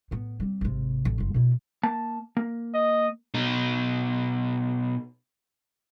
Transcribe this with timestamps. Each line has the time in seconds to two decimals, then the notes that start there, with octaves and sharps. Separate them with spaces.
0.11 A2 B3
0.40 G3 C4
0.61 G#1 C3
1.05 A1
1.18 F#1 F4
1.34 B2 E4
1.83 A#3 A5
2.37 A#3
2.74 D#5
3.34 B2 D#4